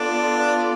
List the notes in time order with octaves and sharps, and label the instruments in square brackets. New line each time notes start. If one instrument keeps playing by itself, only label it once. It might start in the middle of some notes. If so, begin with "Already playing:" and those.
Already playing: [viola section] B3 F4 A4 D5 [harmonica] D4